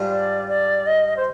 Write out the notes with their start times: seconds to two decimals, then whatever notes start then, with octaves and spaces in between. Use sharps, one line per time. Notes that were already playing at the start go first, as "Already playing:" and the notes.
Already playing: G#2 G3 D4 F4
0.10 D5
0.48 D5
0.87 D#5
1.17 C5